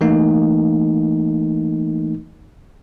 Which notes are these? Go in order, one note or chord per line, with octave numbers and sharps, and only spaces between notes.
E3 A3 A#3 D#4